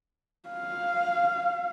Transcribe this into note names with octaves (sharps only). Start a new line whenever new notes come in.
F5